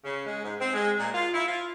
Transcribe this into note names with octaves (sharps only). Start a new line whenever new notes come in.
C#3
G#3
G#2
C4
G#3
A#2
F4
E4
F4